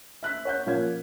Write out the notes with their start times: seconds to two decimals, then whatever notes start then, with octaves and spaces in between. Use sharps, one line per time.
0.23 E5 F#6 B6
0.45 C#5 F#5 G6
0.66 A#2 F3 C#4 F5 G#6